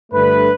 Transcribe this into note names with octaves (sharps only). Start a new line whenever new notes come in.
G2 D3 A3 B4